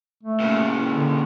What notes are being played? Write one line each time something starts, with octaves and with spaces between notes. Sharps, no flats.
A3
A#2 C#3
D3